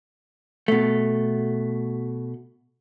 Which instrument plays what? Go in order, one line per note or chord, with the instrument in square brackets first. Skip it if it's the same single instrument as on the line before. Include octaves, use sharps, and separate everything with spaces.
[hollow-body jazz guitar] B2 A3